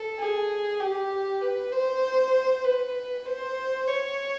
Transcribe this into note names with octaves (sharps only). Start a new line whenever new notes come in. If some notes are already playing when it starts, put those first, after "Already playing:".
Already playing: A4
G#4
G4
B4
C5
B4
C5
C#5